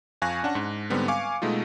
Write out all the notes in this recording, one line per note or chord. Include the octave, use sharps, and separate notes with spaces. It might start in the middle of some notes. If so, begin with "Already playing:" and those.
F2 F5 G#5 C#6 F#6 A#6
C#4 D4 F#5 A5 C#6
G#2
G#2 D3 G3 B3 C4
F5 G#5 C#6 D6 C#7
B2 G#3 A3 D#4 F4